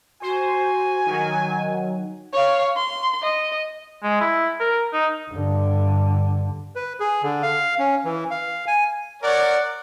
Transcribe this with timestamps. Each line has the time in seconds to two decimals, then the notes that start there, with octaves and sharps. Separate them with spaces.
0.22 F#4 C5 G#5
1.06 D#3 F#3
2.33 C#5 F5
2.76 C6
3.22 D#5
4.03 G#3
4.21 E4
4.60 A#4
4.93 D#4
5.30 G2 D3
6.76 B4
7.00 G#4
7.23 D3
7.43 F5
7.79 C#4
8.05 E3
8.31 F5
8.67 G#5
9.22 A#4 C#5 D5 F#5